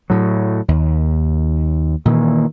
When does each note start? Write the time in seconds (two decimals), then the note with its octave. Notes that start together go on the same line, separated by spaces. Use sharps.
0.10 A2 F#3
0.68 D#2
2.05 A#2 D#3 E3